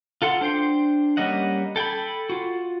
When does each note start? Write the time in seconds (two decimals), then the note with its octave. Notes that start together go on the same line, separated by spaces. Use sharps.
0.22 F4 A4 F#5 C6
0.41 D4 C5 G5 C6
1.17 G3 A#3 C#4 D#5 F#5
1.76 A4 G5 G#5 B5
2.30 F4 F#4